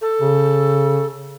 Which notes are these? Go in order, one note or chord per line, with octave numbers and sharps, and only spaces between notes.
A4
C#3